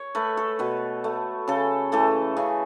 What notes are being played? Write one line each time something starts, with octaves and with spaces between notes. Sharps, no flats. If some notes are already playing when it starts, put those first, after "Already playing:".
Already playing: C#5
A3 B4
A4
B2 B4
A3
C#3 A4
E3 A3 A4
C#3